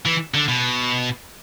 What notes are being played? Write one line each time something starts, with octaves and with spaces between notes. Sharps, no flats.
E3
D3
B2